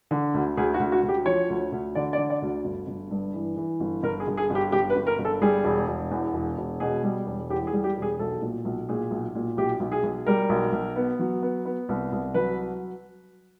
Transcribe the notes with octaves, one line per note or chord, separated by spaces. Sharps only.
D3
D2
D2 G#4
F#4
D2
F#4
D2
G4
F3 C#5
D2
D2
D3 D5
D5
D3
D5
D2
G1
G1
G2
E3
E3
G1
G1 A#4
G#4
G1
G#4
G1
G4
G1 G4
B4
G1
A#4
G1
A4
G3 G#4
E1
E1
E2
E1
E1
B2 G#4
G3
E1
E2 G4
G#4
G3
G4
E1
G#4
B1 A4
A#2
B1
A#2 G#4
B1
A#2
B1 G4
B1
G#4
B1
G3 A#4
B1
B1
B3
F#3
B3
B3
C2
C2
F#3 B4